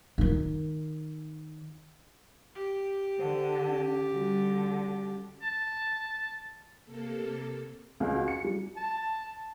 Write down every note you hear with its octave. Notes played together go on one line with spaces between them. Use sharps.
D#3 D#4
G4
D3 C5
C#4
D3 G3 F#4
A5
C3 A#3 A4
C#2
F#4
C#7
G3
A5